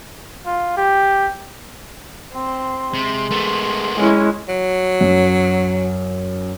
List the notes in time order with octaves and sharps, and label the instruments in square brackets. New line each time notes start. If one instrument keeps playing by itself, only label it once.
[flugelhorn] F4
G4
[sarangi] C4 [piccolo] C6
[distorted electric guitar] C3 [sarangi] G#3
[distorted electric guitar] A3 B3
[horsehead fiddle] G#3 E4 [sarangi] C#4
[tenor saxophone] F#3
[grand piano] F#2